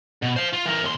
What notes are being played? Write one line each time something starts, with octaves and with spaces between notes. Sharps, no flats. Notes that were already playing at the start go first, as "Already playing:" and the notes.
B2
C5 F5
F4
E3 A#4
D#2 C6